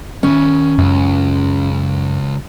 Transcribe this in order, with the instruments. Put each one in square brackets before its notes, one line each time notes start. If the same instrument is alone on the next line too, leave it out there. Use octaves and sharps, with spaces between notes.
[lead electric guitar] D#3 E5 [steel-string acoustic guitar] C#4
[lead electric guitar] C#2 [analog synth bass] F#2